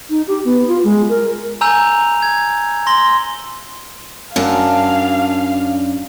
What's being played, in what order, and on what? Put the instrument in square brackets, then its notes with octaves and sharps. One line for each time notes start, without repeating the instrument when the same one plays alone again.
[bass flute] D#4
G4
B3
F4
G#3
A#4
[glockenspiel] G#5 A#5 E6 G6 F7
G#6
C6 A#6 G7
[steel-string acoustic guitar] F#2 D4 [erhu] F5